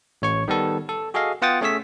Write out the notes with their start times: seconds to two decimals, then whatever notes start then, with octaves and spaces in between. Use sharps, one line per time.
0.22 A1 C#5 C#6
0.48 D#3 G3 B3 A4
0.89 A4
1.14 F#4 G#4 A4 D#5 F5
1.42 B3 F4 F#5 G5 D#6 A6
1.61 A3 C#4 G#4 C#5 E6 B6